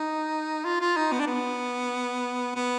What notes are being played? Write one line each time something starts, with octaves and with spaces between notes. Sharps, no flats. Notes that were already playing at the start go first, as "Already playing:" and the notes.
Already playing: D#4
F4
F4
D#4
B3
D4
B3
B3